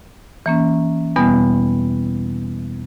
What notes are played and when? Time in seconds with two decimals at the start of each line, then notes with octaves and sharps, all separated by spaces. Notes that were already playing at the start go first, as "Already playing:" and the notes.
0.46 E3 A#3 C#4
1.16 E2 B2 G3 B3